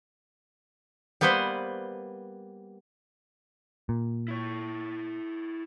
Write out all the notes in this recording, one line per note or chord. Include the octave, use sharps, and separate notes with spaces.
G3 A#3 B3 B4 C5
A#2
E4 C#5